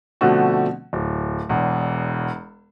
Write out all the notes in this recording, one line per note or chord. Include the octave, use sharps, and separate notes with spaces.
B2 D3 F3 A3 C4 F#4
D1
E1 E2